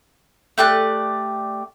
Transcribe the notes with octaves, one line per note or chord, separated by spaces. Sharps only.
A3 G4 D5 F#6